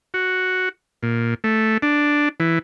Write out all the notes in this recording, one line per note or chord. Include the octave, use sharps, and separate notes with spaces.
F#4
A#2
A3
D4
E3